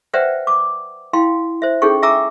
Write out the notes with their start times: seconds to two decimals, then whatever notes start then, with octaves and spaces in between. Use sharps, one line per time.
0.13 B4 C5 D5 E5 F#5 G5
0.47 D6
1.13 E4 F5 G5 C6
1.62 C5 E5
1.82 C#4 D#4 G#4 A4 G5 C#6
2.03 E5 G5 G#5 A#5 D6 E6